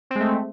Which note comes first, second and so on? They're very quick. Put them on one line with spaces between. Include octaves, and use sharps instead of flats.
C4 G#3 A3